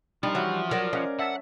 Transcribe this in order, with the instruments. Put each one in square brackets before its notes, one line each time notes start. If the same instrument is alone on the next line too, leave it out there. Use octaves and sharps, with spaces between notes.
[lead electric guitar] F3 [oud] G3 [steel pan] D4 D#4
[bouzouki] E3 F#4 F#5 [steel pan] C#5
[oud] F#3 [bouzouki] A#4 D5
[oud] C#4 [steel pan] D#5 F5 F#5
[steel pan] E5 A5 E6 [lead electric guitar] F#5